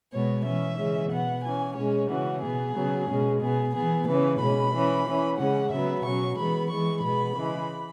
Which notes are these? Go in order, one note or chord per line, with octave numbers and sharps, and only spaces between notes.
B2 G#3 B3 C#5
E3 C#4 E5
C#3 E3 G#3 C#4
B2 B3 F#5
E3 C#4 G#5
B2 G#3 C#4 C#5
C#3 E3 C#4 F#4
B2 B3 G#4
C#3 F#3 B3
B2 G#3 C#4
B2 B3 G#4
E3 B3 G#4
C#3 E3 C#4 B4
B2 G#3 C#4 B5
E3 C#4
E3 C#4
C#3 G#3 C#4 F#5
C#3 F#3 B3 E5
B2 F#3 C#4 C#6
E3 G#3 B3 B5
E3 G#3 B3 C#6
B2 G#3 B3 B5
C#3 E3 G#3